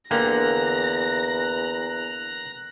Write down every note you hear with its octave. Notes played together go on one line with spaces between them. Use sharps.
E2 D3 A#3 G5 A#5 F#6 A#6